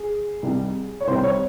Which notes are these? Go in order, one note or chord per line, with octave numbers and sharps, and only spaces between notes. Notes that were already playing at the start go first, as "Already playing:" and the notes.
Already playing: G#4
C2 C3 D#3 G3
C#5
C2 C3 D#3 G3 C5
C#5